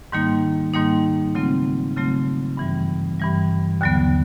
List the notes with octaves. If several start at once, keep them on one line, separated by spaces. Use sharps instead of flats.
G#2 D#3 G3 A#3 D#4
G#2 D#3 G3 A#3 D#4
C#3 F#3 A3 C4 F4
C#3 F#3 A3 C4 F4
G2 E3 G3
G2 E3 G3
D#2 D3 F#3 B3